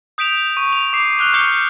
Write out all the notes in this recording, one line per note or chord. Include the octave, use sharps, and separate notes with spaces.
D#6 G6 B6 D7 E7 F7
C#6
F7
D6 C7
F6 F#6 F7
C#6 D6 G6 C#7 G7